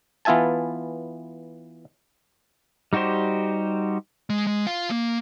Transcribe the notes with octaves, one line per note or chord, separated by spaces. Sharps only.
E3 B3 F4 E5 G#5 A5
G3 D#4 F#4 G4 C5
G#3
G#3
F4 F5
A#3